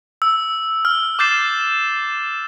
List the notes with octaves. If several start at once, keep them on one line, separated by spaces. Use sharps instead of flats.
E6
F6
D6 F6 G6 A6 C7 E7